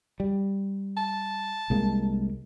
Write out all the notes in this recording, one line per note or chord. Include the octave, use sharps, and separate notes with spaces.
G3
A5
C2 G#3 A#3